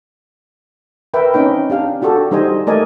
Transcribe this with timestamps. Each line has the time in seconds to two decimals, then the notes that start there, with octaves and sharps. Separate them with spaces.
1.14 A#4 B4 E5 G5
1.34 C4 C#4 D#4 G5
1.70 D4 G4 F5
2.02 D4 F#4 G4 A4
2.31 G3 D#4 C5 D#5 G#5
2.67 A3 A#4 D5 D#5 G#5